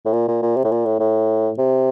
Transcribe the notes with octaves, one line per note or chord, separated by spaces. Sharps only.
A2
A#2
A#2
A#2
C3
A2
A#2
A2
A2
C3